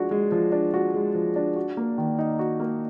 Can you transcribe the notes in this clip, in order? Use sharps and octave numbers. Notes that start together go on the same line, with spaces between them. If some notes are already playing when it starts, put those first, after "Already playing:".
Already playing: F3 G#3 D4 F#4
G#3
F3
D4
F#4
G#3
F3
D4
F#4
A#3
D#3
D#4
F#4
A#3